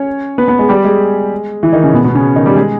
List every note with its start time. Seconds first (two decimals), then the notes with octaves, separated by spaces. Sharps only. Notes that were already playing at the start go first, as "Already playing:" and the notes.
Already playing: C#4 C#5
0.38 B3 B4
0.48 B3 B4
0.59 G#3 G#4
0.69 G3 G4
0.84 G#3 G#4
1.63 E3 E4
1.73 D#3 D#4
1.83 C#3 C#4
1.94 B2 B3
2.04 B2 B3
2.15 C#3 C#4
2.36 D#3 D#4
2.46 G3 G4
2.56 G#3 G#4